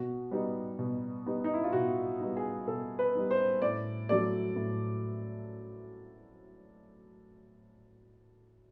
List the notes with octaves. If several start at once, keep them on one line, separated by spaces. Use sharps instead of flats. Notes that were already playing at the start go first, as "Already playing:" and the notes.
Already playing: B2 F#4
G3 B3 D#4
B2
G3 B3 D#4
D#4
E4
F4
B2 F#4
G3 B3 D#4
G#4
B2 A4
B4
G3 B3 D#4
C5
A2 D5
F#3 A3 D5
A2